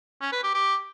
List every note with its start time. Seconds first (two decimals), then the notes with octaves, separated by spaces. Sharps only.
0.21 C#4
0.32 B4
0.43 G4
0.55 G4